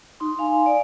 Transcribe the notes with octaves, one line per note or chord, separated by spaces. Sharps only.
D#4 C6
F5 G#5
D5